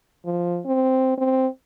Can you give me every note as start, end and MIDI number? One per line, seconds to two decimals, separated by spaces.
0.25 0.60 53
0.65 1.14 60
1.18 1.47 60